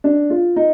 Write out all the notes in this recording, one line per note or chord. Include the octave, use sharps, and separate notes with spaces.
D4
F4
D#4